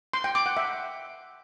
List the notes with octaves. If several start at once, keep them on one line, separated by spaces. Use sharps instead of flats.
C6
G5
D6
F#5
E5